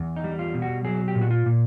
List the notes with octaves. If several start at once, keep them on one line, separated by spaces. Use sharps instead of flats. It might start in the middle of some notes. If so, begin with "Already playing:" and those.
Already playing: E2
D#4
G3
F4
B2
F#4
F#3 G#4
G4
A#2
F#4
F4
A#2